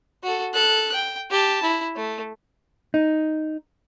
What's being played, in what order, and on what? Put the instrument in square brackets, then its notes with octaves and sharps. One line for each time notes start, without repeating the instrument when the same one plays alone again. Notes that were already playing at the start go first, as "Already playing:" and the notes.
[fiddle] F#4 A4
A4 F#6
G5
G4 A5
E4
A3
[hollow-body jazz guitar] D#4